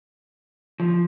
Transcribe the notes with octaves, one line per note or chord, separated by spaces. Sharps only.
F3